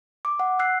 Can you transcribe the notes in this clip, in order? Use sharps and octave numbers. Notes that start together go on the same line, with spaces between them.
D6
F#5
E6 F#6 C7